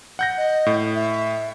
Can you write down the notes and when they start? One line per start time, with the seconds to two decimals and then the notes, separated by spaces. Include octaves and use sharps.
0.19 F#5 G6 A#6
0.38 D#5
0.66 A2
0.95 E5